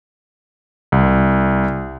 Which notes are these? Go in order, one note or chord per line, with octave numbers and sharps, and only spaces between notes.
C2